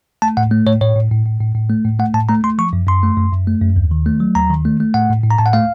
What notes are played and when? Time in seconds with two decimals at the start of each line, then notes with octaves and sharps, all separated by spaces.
0.22 A3 A5
0.37 A2 F#5
0.51 A3
0.66 A2 C#5
0.81 A2 C#5
0.96 A2
1.11 A2
1.26 A2
1.41 A2
1.55 A2
1.70 A3
1.85 A2
1.99 A3 F#5
2.14 A2 A5
2.29 A3 A#5
2.44 A3 C6
2.58 F3 C#6
2.73 F#2
2.87 F#2 C6
3.03 A3
3.17 F#2
3.32 F#2
3.47 A3
3.61 F#2
3.76 D#2
3.91 D#3
4.06 A3
4.20 F#3
4.35 D#2 A#5
4.50 D#3
4.65 A3
4.80 A3
4.94 A2 F#5
5.09 A2
5.24 A2
5.31 A#5
5.39 A2 A5
5.46 F#5
5.53 A3 F5